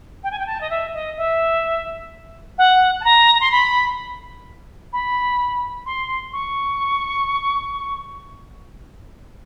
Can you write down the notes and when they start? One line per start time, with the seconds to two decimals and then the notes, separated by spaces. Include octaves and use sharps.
0.23 G5
0.31 G#5
0.39 G5
0.46 A5
0.60 D#5
0.70 E5
0.94 D#5
1.17 E5
2.58 F#5
3.00 A5
3.04 A#5
3.40 C6
3.51 B5
4.93 B5
5.86 C6
6.33 C#6